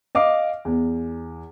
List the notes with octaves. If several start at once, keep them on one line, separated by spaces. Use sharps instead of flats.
D#5 F5 D6
E2